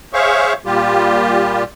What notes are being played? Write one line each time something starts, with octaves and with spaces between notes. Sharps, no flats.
G#4 C5 C#5 E5 F5 C#6
A#2 G3 F4 G4